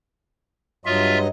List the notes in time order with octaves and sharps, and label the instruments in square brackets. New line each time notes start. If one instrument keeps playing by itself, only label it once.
[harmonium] G2 F#3 D#5 [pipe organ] F4 E5